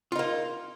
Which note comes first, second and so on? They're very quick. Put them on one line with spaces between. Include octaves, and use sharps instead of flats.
F4 D#4 A#3